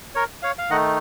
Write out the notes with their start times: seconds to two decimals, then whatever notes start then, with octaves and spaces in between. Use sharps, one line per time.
0.15 A#4 C#5
0.42 C#5 F5
0.59 F5
0.70 D#3 A3 D#4 D#5 F#5